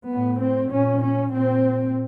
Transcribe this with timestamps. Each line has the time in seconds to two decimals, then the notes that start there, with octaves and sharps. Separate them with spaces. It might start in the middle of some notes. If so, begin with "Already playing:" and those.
0.10 A2 B3
0.41 C4
0.72 A#2 C#4
1.02 C#4
1.33 A#2 C4